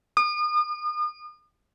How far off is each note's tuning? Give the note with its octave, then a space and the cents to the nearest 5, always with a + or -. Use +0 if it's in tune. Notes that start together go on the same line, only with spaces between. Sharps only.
D#6 -40